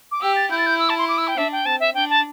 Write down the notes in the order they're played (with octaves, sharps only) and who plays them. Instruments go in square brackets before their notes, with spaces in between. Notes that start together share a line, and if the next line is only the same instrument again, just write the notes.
[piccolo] D6
[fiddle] G4 [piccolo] E6
[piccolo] A6
[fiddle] E4 [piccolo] G6
[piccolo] A6
G6
E6
A5
C6
D6
E6
G5
[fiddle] D4 [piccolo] E5
[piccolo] G5
[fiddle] C4 [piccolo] A5
[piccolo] E5
[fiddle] D4 [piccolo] G5
[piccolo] A5